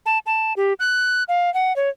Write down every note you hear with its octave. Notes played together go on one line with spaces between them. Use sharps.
A5
A5
G4
F#6
F5
F#5
C#5